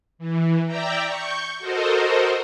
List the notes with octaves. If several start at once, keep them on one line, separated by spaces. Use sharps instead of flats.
E3
D5 E5 G5 A#5
C#6 G6
F#4 A4 A#4 C5 D#5